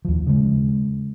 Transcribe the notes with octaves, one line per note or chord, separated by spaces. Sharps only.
D#2 F3
C#3 G#3